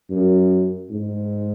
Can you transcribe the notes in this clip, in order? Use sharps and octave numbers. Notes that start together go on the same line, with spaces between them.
F#2
G#2